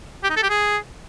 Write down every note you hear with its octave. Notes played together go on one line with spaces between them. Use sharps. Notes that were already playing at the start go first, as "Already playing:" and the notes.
G4
D#4
A4
G4
G#4